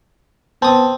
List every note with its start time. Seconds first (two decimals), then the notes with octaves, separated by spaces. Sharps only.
0.62 B3 C4 A5 D#6